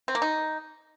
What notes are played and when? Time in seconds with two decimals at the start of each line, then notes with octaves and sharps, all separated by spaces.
0.08 C4
0.15 A#3
0.22 D#4